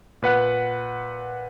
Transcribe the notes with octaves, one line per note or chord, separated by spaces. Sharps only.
A#2 B4 F#5 F#6